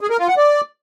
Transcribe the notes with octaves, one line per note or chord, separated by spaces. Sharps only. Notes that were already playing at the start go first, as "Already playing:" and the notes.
G#4
A#4
F4
F#5
D5